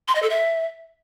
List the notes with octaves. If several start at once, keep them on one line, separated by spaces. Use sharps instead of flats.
C6
D#5
A4
E5